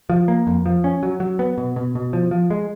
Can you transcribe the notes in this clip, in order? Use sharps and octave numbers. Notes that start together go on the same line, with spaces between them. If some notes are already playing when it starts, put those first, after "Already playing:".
F3
A#3
F2
F3
C#4
F#3
F#3
B3
B2
B2
B2
F3
F3
G#3